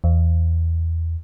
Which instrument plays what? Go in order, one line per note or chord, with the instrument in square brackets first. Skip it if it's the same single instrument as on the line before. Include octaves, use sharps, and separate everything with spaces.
[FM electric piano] E2